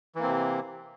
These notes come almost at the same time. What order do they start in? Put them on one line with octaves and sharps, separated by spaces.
E3 A#3 C4 C3